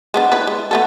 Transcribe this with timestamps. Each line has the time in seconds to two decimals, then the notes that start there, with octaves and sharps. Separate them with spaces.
0.14 G#3 B3 D4
0.32 E4 B4
0.47 G#3
0.71 A3 B3 A4